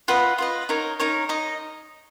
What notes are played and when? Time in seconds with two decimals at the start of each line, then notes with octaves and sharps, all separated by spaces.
0.08 F4 B4 D#5 F#5
0.38 F4 B4 D#5
0.69 D#4 A#4 C#5
0.99 D#4 A#4 C#5
1.29 D#4 D#5